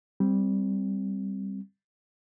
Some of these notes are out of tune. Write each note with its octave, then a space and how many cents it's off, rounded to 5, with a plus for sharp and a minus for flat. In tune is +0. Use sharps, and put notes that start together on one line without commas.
G3 +0 C4 +0